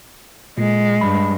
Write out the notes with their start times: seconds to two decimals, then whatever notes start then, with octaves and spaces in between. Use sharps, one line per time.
0.58 A#2 G#3
1.01 G2 B5